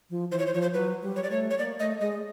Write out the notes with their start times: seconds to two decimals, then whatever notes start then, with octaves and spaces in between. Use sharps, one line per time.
0.10 F3
0.31 E3 C5
0.39 C#5
0.47 C5
0.53 F3 C#5
0.62 C5
0.73 F#3 B4
1.02 G3
1.16 C#5
1.23 D5
1.30 A3 C#5
1.50 C#5
1.58 A#3 D5
1.79 A3 D#5
2.00 G#3 D#5